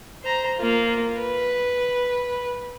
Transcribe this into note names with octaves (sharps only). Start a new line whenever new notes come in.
C5 A#5
A#3 F4
B4